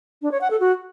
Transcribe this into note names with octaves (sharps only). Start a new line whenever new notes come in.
D4
C#5
F#5
A4
F#4